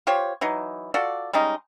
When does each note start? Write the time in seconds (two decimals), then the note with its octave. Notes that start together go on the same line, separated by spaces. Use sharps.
0.07 F4 G4 C5 C#5
0.41 E3 F#3 D#4
0.94 F4 F#4 A4 D5
1.33 G3 G#3 C#4 D#4